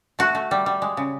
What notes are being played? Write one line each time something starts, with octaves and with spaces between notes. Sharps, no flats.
A3 F#4
A3
G3
G3
G#3
C#3